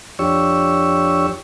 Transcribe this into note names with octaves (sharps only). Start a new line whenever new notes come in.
F2 D4 G4 C#5 C#6 E6